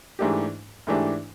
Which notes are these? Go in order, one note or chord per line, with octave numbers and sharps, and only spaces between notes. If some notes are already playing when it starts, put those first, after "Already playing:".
G#2 E3 A3 D4 G4
G#2 E3 A3 D4 G4